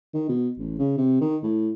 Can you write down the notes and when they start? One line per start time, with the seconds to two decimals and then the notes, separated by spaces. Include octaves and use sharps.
0.14 D#3
0.29 B2
0.58 A1
0.79 C#3
0.98 C3
1.21 D#3
1.43 A2